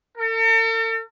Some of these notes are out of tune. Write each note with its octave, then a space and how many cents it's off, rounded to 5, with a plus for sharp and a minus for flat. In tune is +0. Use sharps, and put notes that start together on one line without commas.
A4 +45